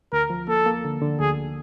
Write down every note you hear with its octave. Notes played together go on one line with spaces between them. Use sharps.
D2 A#4
F3
A#3 A4
A#3
D3
D3
D2 G#4